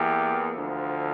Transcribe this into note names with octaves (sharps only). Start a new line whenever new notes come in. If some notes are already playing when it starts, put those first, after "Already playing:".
Already playing: E2 E3 A#3 G4
D2 D3 F3